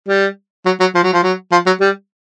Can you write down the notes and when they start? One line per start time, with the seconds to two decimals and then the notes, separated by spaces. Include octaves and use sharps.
0.08 G3
0.66 F#3
0.80 F#3
0.95 F3
1.03 F#3
1.13 F3
1.23 F#3
1.52 F3
1.66 F#3
1.80 G3